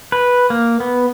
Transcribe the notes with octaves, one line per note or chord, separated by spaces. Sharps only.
B4
A#3
B3